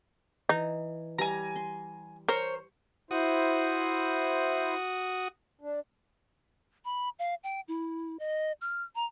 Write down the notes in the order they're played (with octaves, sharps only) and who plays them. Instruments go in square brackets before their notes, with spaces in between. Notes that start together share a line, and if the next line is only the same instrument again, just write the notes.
[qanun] E3 [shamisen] D#4
[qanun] G3 [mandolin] G#5 A#5
[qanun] C6
[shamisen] A#4 [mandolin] C5 C#5
[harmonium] E4 C5 [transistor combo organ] F#4 D#6
[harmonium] D4
[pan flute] B5
F5
G5
E4
D#5
F6
A#5